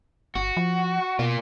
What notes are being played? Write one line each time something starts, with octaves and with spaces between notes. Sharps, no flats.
G1 F#4
F3
B2 A#3 F4